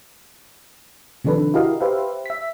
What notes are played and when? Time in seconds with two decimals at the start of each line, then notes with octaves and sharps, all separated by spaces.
1.24 C3 D#3 F3 D4 A4 B4
1.54 E4 F#4 G4 A#4 D#5 F5
1.81 G4 B4 C5 E5 F5
2.26 E5 B6